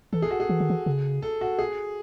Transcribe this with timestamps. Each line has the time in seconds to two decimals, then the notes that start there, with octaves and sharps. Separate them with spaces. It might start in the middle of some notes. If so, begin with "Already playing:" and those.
0.13 E3 A4
0.22 G#4
0.31 F#4
0.40 G#4
0.49 E3
0.60 D#3
0.70 E3
0.86 C#3
1.22 A4
1.41 F#4
1.59 G#4